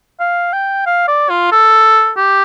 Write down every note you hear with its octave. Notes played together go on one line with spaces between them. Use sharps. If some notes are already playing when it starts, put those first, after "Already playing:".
F5
G5
F5
D5
F4
A4
G4